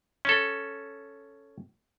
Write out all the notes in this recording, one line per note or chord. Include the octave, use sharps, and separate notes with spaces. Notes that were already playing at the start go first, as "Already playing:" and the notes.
C#4 A4